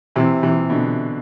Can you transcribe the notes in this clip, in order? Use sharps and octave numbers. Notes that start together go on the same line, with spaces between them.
C3 E3
C3 E3
B2 D3